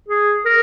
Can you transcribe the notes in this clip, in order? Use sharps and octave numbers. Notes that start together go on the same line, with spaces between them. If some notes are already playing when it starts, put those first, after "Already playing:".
G#4
A#4